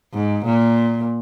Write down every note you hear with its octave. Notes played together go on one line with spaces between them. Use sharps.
G#2
A#2